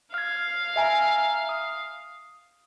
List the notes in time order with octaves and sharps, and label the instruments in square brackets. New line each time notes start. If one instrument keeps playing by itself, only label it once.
[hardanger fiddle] F5 [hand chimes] F6 G#6
[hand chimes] E5 G#5 A#5
D#6